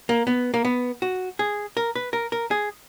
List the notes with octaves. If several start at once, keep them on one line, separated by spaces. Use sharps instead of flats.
A#3
B3
A#3
B3
F#4
G#4
A#4
B4
A#4
A#4
G#4